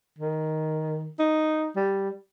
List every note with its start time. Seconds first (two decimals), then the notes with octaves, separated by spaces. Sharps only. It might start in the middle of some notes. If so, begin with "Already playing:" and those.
0.19 D#3
1.19 D#4
1.76 G3